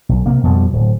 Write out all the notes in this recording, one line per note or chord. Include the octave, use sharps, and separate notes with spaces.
B1
C3 A#3
F2 B2 F3 G3
D1